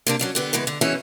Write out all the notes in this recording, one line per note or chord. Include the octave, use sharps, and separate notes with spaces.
C3 A#3 D4
F#3 C#4 D4
D3 B3 G4
C#3 E3 G#3 B3
D3
B2 E3 C#4 E4 G#4 C#5